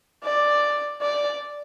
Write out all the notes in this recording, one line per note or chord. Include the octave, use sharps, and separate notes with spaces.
D5
D5